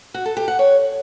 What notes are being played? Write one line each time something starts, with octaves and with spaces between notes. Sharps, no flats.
F#4
A4
G4
F#5
C#5